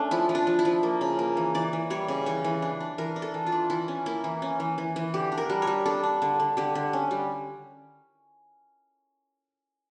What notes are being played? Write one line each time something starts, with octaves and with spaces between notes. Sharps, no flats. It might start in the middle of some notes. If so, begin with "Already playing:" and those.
Already playing: A3 C#4 D4
F3 E4
F3
D4
F3
E4
F3
A#3
C#3
A#3
E3
E3 D5
E3
G3 C#5
C#3
E3 C#5
E3
D4
D4
E3 A#4
D4
A4
E3
F4
D4
E3 E4
C#4
A#3 E4
E3
C#4
E3
E3
E3
D3 G4
D4
A#4
G3
C#5
G3
D4 A4
D4
D3
D3
D3 G4
D3
C#4
G3